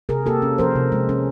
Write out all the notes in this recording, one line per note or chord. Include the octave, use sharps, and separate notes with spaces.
C3 G#4 A#4
A#3 G4 A4
C#4
F3 A#4 C5
C3
G#3
C#4